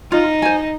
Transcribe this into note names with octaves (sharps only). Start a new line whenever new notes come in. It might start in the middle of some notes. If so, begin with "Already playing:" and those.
D#4 F4
C5 G#5